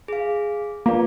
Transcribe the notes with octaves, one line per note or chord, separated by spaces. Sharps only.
G#4 F5
A#3 F4 B4 D5